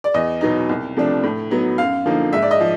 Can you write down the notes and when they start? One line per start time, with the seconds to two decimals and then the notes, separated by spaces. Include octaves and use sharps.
0.04 D5
0.14 E2 D#5
0.41 B2 F#3 B3 D#4
0.69 C2
0.97 C3 F3 A3 D4
1.23 A2
1.51 F#3 B3 D#4
1.78 F#2 F5
2.06 D3 F3 A#3 D#4
2.33 G#2 E5
2.42 D5
2.51 D#5
2.60 F3